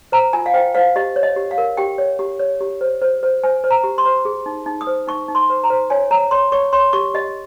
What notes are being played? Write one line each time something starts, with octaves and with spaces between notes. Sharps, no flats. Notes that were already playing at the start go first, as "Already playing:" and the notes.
C5 A#5
F4 G#5
F5
C5 G5
C5 F5
G4 D#5
C#5
D#5
G4
F5
A#4
G4 G5
C#5
G4
C#5
G4
C5
C5
C5
C5 G#5
C5
A#5
G4
C6
C5
G#4
D#4
D#4
D#6
C5
D#4 C#6
D#4
C6
C5
A#5
C5
C#5 G#5
C#5 A#5
C#5 C6
C#5 C#6
C#5 C6
G4 C#6
G4 D#5